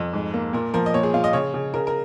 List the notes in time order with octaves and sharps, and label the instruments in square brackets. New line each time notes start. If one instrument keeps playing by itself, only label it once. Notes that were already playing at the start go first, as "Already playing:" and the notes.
Already playing: [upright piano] F2
G#2
A#3
A#2 A#4
F3 A#4
D#5
A#2 C#5
G#4
A#2 F4
D#5
C#3 C#5
C#3
C#3 A#4
A#4